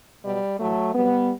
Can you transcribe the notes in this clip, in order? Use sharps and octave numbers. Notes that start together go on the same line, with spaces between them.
B2 F#3 G3
A2 E3 F#3 A3
C3 F#3 G3 B3